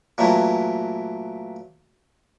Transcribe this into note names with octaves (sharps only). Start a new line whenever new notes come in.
A#2 E3 F#3 A3